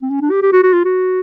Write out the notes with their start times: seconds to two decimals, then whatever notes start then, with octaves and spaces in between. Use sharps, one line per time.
0.02 C4
0.10 C#4
0.21 D4
0.31 G4
0.42 G4
0.52 F#4
0.63 F#4
0.73 F4
0.85 F#4